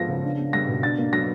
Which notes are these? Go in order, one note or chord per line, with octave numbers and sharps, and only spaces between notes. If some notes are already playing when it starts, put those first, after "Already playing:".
Already playing: F3 G#3 B3 A#6
C#3
D4
B3
G3 A#6
B2
D4 A6
A#3
F#3 A#6